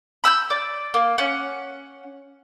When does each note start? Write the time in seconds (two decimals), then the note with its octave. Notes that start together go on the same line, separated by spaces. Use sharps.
0.24 B5 E6 F6 G6
0.50 D5
0.94 A#3
1.18 C#4 F#5